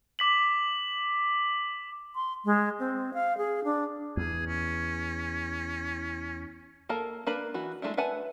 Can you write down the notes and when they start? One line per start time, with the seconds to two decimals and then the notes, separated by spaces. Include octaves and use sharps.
0.19 D6 B6 F#7
2.15 C6
2.45 G#3
2.79 C4
3.14 F5
3.38 G#4
3.64 D4
4.17 E2 G#4
4.47 C#4
6.89 A#3 A4 A#4 A5
7.27 A#3 D4 A#4 B4 B5
7.54 E3 F#4
7.82 G#3 A3 D4 E4
7.97 B4 E5 F#5 G#5 A5